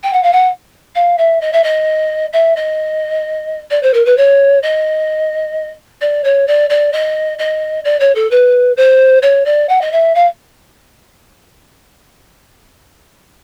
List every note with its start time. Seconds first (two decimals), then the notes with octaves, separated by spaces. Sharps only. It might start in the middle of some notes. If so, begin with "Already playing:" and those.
0.03 G5
0.13 F#5
0.23 F5
0.33 F#5
0.95 F5
1.18 E5
1.41 D#5
1.53 E5
1.64 D#5
2.33 E5
2.56 D#5
3.71 D5
3.83 C5
3.94 A#4
4.06 B4
4.17 C#5
4.63 D#5
6.01 D5
6.24 C#5
6.48 D5
6.70 D5
6.93 D#5
7.39 D#5
7.85 D5
8.00 C#5
8.15 A4
8.31 B4
8.77 C5
9.22 C#5
9.46 D5
9.69 F#5
9.81 D#5
9.92 E5
10.15 F5